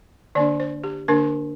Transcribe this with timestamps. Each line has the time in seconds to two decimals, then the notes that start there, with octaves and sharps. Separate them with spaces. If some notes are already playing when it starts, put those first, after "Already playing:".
0.35 D3 A#3 D4 D5
0.60 C5
0.84 G4
1.08 D3 A#3 D4 A#4